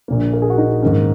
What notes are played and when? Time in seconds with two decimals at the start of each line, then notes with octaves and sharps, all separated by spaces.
0.08 A#1 A#2 A#3
0.33 A#4
0.42 G#4
0.50 F#4
0.58 D#4
0.82 G#2 D#3 A#3 C#4